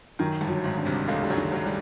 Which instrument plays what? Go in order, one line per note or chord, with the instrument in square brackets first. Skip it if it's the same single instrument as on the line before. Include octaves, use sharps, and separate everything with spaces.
[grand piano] F#2 [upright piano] D#3
[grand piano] G1 G2
[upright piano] F#3
[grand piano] G#1 G#2
[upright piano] D4
[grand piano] C2 C3
[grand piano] C#2 C#3 [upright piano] A3
[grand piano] G3
F#2 F#3
[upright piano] D#3
[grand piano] F#2 F#3
G3